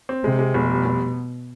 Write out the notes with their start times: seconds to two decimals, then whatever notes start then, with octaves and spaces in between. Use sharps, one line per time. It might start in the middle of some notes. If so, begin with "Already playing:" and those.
0.09 C4
0.24 C3 G#3
0.39 G#3
0.54 F1 B2
0.70 G3
0.85 F1